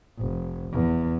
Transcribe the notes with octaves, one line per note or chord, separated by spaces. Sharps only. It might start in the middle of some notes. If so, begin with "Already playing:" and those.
F1
E2